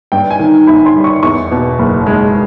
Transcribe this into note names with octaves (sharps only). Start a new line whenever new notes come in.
G2 G5
G#5
D#3
G1 B5
C6
G3
C#6
E2 C#6
B2
F#1
G#3